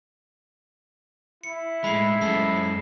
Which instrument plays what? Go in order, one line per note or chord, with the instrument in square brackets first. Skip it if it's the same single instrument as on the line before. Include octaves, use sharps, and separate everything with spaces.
[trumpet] E4 [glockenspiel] C#7
[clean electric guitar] A2 G#3 [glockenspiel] B5 C7
[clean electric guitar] F#2 G#3 A4 [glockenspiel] C7